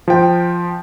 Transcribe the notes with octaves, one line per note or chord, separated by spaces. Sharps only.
F3 G5